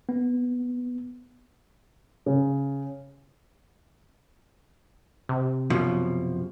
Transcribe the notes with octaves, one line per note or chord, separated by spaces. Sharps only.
B3
C#3
C3
F#2 B2 F3